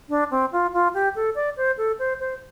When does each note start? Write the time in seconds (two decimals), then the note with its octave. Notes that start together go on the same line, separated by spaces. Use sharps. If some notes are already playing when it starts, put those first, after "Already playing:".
0.09 D4
0.31 C4
0.52 F4
0.73 F4
0.94 G4
1.15 A4
1.35 D5
1.57 C5
1.77 A4
1.99 C5
2.20 C5